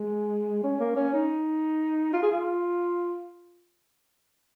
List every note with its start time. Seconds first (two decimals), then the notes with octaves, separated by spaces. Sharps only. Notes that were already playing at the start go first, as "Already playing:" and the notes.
Already playing: G#3
0.64 C#4
0.80 A#3
0.96 C#4
1.14 D#4
2.13 F4
2.23 G#4
2.31 F4